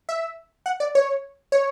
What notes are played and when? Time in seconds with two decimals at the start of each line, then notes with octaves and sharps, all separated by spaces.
0.09 E5
0.66 F#5
0.80 D5
0.95 C#5
1.52 C#5